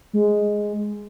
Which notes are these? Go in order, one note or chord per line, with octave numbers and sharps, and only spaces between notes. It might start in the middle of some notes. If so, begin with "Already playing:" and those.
G#3